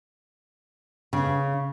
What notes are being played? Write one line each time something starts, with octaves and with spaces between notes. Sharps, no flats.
C#3